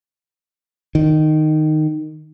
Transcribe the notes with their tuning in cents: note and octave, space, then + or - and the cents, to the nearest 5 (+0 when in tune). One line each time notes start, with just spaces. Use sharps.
D#3 -10